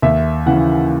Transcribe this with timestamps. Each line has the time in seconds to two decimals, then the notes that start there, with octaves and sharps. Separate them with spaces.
0.02 D#2 E5
0.46 C#3 E3 F#5